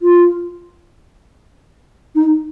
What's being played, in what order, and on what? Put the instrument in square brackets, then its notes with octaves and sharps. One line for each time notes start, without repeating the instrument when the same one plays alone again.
[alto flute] F4
D#4